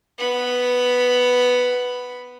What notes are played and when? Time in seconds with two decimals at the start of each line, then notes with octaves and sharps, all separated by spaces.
0.18 B3 B5